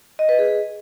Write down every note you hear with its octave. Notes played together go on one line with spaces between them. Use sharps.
D#5
B4
G#4